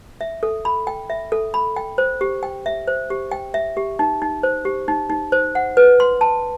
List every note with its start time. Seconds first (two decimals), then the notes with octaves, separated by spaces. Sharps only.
0.21 E5
0.43 A4
0.65 B5
0.87 G5
1.10 E5
1.32 A4
1.54 B5
1.76 G5
1.98 C5
2.21 G4
2.43 G5
2.66 E5
2.87 C5
3.10 G4
3.32 G5
3.54 E5
3.77 G4
3.99 D#4
4.22 D#4
4.43 C5
4.65 G4
4.88 D#4
5.10 D#4
5.32 C5
5.55 F#5
5.77 B4
6.00 C6
6.21 A5